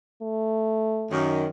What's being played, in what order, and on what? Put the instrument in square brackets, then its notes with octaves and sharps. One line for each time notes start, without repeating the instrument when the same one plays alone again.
[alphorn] A3
[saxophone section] F#2 D#3